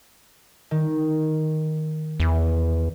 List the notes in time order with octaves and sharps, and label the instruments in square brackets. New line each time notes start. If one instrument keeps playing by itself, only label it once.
[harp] D#3
[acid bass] E2